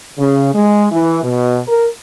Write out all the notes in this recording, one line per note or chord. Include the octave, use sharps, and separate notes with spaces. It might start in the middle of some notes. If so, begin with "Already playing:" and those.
C#3
G#3
E3
B2
A#4